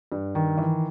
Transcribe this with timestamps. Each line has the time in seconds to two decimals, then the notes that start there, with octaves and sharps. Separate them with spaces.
0.12 G2
0.35 D#3
0.58 E3